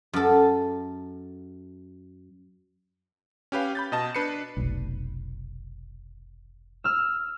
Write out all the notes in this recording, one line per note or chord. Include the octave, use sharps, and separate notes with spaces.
F#2 A4
C#4 G4 B4 F5
B5 G6 A6
B2 D#5 A5
D4 B4 C7 C#7
F1 B1
E6 F6